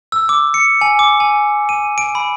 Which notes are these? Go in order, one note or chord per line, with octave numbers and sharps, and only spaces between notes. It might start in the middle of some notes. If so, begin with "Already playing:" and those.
E6
D6
C#7
G#5
D6
G#5
D#7
D7
B5